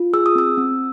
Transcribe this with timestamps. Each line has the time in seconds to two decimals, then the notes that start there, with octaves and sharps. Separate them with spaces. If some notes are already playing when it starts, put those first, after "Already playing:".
Already playing: F4
0.13 G#4 E6
0.26 D#6
0.35 C4 E6
0.58 C4